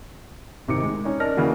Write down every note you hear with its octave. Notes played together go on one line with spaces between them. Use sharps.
G#1 C3 D#4 D6 C#7
G#3
C#4 D#4 C#5
A#4 D5 D#5 A5 F6 A#6
C#3 E3 A#3 F#4